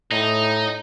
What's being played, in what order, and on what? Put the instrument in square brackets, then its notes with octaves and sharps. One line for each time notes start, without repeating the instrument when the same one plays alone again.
[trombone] A2 [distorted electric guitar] D#4